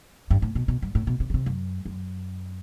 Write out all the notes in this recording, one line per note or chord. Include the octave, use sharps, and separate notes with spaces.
G2
A2
B2
B2
G2
A2
B2
C3
D3
C3
F#2
F#2